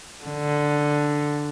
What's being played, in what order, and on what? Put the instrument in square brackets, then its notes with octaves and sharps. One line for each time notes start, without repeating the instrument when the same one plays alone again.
[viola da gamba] D3